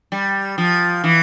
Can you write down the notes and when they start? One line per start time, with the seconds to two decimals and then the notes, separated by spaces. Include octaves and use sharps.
0.12 G3
0.58 F3
1.04 E3